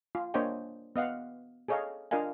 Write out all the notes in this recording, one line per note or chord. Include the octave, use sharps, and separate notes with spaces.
F4
A#3 D4 C5 C#5 D#5 G5
B3 D#5 F5 F#5
G#4 A4 C#5 D#5 F5 A#5
D4 F4 A#4 D#5 F5 G#5